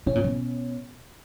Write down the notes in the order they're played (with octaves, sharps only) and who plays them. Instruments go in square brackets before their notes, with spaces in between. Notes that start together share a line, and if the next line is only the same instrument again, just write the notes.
[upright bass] B2 [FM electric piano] C#4
[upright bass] A#2
B2